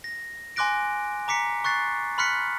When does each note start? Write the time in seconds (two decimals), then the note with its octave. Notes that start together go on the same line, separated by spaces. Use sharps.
0.04 A#6
0.56 G#5 C6 D6 F#6 A#6 D7
1.28 A#5 D6 B6 C#7
1.64 C#6 F#6 A6 C7
2.18 B5 C6 F6 F#6 B6 C#7